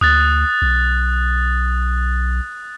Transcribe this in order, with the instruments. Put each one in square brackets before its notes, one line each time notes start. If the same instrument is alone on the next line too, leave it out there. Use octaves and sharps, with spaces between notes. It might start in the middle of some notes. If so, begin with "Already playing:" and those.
[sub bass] D2 [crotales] D#6 F#6 A6
[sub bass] B1